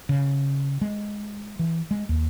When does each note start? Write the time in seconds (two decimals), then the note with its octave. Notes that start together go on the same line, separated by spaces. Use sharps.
0.09 C#3
0.81 G#3
1.59 E3
1.91 G#3
2.09 D#2